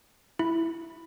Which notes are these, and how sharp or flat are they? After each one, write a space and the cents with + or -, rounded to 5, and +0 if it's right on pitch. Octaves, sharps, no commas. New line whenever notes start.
E4 +0 B5 +0